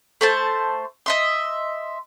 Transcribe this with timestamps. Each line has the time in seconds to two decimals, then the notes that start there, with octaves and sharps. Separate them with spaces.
0.21 A3 C5 A5
1.06 D#5 E5 C6